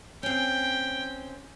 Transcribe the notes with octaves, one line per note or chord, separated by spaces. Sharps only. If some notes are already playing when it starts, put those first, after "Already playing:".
C4 C#4 G5